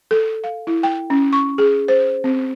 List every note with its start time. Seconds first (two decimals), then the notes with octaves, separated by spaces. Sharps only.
0.11 A4
0.44 F5
0.67 E4
0.83 G5
1.10 C#4
1.33 C#6
1.58 G#4
1.88 C5
2.24 C4